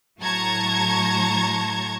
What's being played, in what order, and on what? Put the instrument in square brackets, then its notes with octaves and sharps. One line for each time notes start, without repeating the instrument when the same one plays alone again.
[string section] A2 F#3 A5 A#5 C#6 G#6